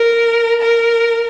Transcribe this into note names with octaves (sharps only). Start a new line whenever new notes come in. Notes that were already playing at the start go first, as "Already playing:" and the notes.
Already playing: A#4
A#4